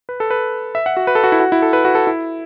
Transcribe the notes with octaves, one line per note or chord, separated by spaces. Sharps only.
B4
A4
B4
E5
F#5
F#4
B4
A4
F#4
E4
F#4
E4
A4
B4
F#4
A4
E4